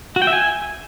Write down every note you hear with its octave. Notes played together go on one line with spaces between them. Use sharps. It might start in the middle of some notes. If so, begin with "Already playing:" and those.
F#4
G5
E5
G#5